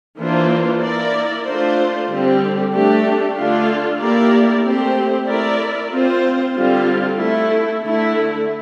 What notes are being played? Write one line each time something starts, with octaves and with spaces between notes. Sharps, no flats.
E3 A#3 D4 F4 C5
A#3 E4 A#4 D5
A3 D4 F4 C5
D3 G3 C4 G4
A3 D4 G4
D3 A3 D4 F4
A#3 E4 G4 A#4 D5
A3 C4 G4 C5
A3 E4 A#4 D5
C4 F4 C5
D3 G3 C4 F4
A3 E4 A4
D3 A3 E4